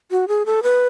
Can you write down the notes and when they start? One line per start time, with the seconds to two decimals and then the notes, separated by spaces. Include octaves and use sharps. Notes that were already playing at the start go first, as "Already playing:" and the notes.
0.11 F#4
0.28 G#4
0.46 A4
0.63 B4